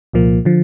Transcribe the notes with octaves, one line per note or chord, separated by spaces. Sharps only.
C2 A#2 F3 A#3
D3 F3